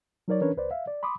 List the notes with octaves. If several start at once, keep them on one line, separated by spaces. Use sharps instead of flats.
F#3 D#4 A#4 C#5 D5
E3 C#4 D4 A#4 B4 C#5
C#2 B4 C5 D5
E5 F5
D5
B5 C6 D6 D#6